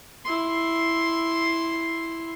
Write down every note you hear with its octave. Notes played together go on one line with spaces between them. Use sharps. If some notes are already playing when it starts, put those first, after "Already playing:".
E4 C6